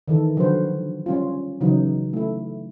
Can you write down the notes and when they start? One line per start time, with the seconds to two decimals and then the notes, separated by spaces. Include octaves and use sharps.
0.08 D#3 E3 A4
0.37 D3 F3 F#3 F#4 B4 C5
1.06 G3 C#4 F4
1.61 C#3 E3 F#3 D#4
2.13 A3 E4